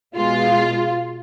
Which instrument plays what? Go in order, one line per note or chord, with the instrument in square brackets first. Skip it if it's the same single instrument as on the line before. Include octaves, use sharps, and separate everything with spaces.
[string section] B2 G#3 F4